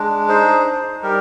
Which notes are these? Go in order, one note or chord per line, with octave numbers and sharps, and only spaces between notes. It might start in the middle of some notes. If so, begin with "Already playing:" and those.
Already playing: G#3 D4
D#4 G#4 C5
D#4
G3 G4 A#4